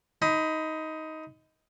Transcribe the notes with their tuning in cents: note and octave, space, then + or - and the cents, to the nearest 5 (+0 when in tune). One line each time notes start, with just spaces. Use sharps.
D#4 +15 B5 +35